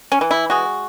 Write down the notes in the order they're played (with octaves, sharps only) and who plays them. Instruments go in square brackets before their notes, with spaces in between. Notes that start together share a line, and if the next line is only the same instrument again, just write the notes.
[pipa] C#4
E3
E4
G#3 F#4